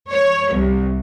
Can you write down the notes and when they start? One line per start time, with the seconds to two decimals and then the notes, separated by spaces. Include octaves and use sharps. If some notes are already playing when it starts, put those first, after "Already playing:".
0.10 C#5
0.53 C2